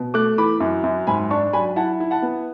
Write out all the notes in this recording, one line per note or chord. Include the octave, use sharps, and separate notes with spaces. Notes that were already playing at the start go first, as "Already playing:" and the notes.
Already playing: B2
A3 D6 F#6
E3 B5 D6
F#2
F#2
G#2 G#5 B5
D4 A5 C#6
F#3 G#5 B5
E4 F#5 A5
E4
F#5 A5
B3